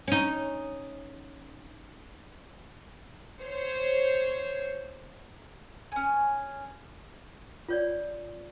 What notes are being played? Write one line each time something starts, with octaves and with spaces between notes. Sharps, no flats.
C#4 D#4
C5 C#5 C7
C#4 G#5
F4 C#5 D5